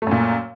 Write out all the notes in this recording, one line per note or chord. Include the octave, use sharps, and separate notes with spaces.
F#2 A#2 A3